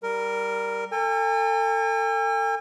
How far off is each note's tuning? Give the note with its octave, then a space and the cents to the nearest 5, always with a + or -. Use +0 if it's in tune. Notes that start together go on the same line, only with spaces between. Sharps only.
G3 +0 A#4 +0
A4 +35 G#5 -45